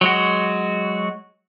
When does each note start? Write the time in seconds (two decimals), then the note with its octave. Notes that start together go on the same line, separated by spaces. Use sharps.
0.01 F#3 G#3 F#4